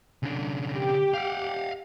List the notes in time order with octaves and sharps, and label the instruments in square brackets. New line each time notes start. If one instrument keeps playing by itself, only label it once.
[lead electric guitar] C#3 D4
[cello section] G4
[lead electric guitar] F5 F#5